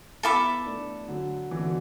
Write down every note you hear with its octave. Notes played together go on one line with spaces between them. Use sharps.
B3 E4 A4 E5 B5 D6
A3 D4
D3 F#3
E3
D3
B2